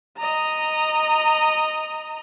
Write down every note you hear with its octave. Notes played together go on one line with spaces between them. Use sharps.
D#5 A#5